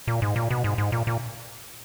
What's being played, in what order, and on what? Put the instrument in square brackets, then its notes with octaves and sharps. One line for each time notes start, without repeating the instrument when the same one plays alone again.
[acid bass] A#2
G#2
A#2
B2
G#2
G#2
A#2
A#2